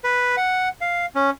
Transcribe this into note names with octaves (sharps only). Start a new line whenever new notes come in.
B4
F#5
F5
C#4